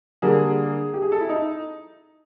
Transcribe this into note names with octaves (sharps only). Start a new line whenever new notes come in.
D3 G3 A#3 G#4
G4
G#4
A4
E4
D#4